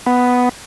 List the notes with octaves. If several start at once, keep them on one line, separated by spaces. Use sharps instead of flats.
B3